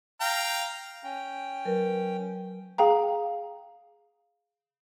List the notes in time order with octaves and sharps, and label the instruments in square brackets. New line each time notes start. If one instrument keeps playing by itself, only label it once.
[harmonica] F5 G5 A#5
[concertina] C#4 G5
[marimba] F#3 A#4 B4
[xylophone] G#4 F5 G5 A#5